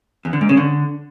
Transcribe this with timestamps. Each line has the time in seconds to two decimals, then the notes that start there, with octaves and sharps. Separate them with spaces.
0.25 E2
0.33 D3
0.41 G#2
0.49 C#3
0.57 D3